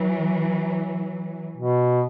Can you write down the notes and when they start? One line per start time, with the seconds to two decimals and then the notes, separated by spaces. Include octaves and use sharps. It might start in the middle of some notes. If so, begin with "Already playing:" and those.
Already playing: E3 F#3
1.57 B2